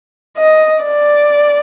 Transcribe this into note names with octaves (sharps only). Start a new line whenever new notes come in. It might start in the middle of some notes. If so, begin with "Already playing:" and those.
D#5
D5